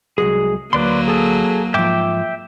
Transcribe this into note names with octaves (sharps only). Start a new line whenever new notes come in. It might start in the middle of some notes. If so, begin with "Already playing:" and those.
C2 F#3 G#3 G#4
D2 F#3 A#3 B4 D5 C6
G#4 A4
G#2 F3 E5 G5 D6